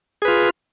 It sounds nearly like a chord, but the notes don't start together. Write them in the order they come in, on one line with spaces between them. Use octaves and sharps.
G#4 B4 F4